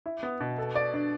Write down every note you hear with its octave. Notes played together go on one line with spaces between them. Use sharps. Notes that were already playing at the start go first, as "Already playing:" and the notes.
E4
B3
B2
A4
D5
D4